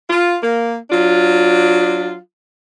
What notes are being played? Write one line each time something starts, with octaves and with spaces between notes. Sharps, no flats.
F4
A#3
F#3 D4 F4